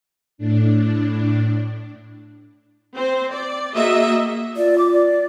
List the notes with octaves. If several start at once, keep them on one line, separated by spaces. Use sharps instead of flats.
A2 D4
C4 C5
D5
A#3 F#4 G#4 D#5 E5
F4 D5
D6
D5